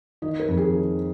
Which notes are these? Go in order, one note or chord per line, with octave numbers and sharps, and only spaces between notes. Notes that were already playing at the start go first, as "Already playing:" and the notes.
D#3 D#5
A#4
F2
G#4
D#3